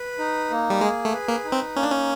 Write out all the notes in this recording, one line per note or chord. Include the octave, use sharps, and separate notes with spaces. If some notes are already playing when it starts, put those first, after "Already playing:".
Already playing: B4
D#4
A#3
G3
G#3 G#4
A3
B4
A#3
D#4
C4
A#3 C#4
D4
C#4